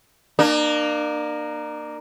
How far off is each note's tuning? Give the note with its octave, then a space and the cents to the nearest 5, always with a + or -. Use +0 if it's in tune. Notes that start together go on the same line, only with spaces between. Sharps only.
A#3 +0 D4 +40